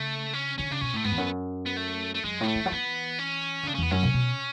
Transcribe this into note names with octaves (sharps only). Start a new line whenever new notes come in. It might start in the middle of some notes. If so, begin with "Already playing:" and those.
Already playing: C#3 A3
C#4
D3 C#4
C#3 D4
B2 C#4
A2 A3
G#2 B3
E2
F#2
B3
A3
A3
F#2 G#3
A2 B3
A3
D3
F#3
E3 B3
C#4
D3
C#3 D4
C#4
E2 B3
F#2 C#4
B2
B2